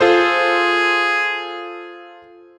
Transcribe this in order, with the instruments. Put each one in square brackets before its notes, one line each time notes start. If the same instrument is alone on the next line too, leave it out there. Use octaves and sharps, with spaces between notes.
[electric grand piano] F4 A4 C5 [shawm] G#4